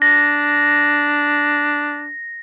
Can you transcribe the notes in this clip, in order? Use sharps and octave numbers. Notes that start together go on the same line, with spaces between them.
D4 A#6